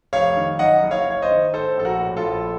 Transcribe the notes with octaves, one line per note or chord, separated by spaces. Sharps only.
F1 C#5 F5
D#3
F#2 D#5 F#5
F#1
C#5 F5
F#1 C#5
C5 D#5
D#3
A2 A4 C5
A#1 A4
F#4 A#4
A2
F4 A4
A#1